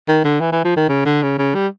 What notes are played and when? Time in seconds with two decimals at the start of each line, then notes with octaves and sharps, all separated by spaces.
0.08 D#3
0.24 D3
0.41 E3
0.52 E3
0.64 F3
0.77 D#3
0.89 C#3
1.05 D3
1.22 C#3
1.38 C#3
1.55 G3